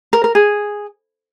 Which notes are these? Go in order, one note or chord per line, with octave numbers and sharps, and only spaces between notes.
A#4
A#4
G#4